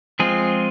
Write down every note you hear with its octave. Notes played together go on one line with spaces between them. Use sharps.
F3 G#3 C4 F4 G#4